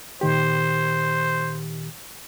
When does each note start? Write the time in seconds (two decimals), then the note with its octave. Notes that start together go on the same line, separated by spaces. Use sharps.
0.21 A#2 D#3 G4 C5